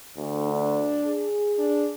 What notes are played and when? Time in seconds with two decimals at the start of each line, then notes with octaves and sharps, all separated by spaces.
0.17 D2
0.48 D4
1.05 G#4
1.58 D4